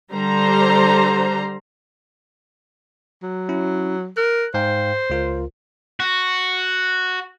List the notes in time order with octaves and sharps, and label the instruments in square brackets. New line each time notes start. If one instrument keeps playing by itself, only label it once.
[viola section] D3 G3 C5 A#5
[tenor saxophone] F#3
[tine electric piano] C#4 E4
[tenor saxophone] A#4 [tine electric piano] F#6
[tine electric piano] G#2 F5 G5 [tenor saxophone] C5
[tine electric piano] C#2 F4 A#4
[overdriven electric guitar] F#4